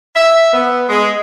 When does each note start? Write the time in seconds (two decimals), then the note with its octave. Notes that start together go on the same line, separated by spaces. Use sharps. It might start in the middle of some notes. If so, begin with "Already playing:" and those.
0.15 E5
0.53 B3
0.88 G#3